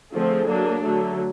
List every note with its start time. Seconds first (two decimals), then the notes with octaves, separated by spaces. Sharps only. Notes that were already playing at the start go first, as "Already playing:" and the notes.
0.11 D3 F3 A3 C4 G#4
0.47 F#3 A#3 D4
0.82 D3 F#3 A3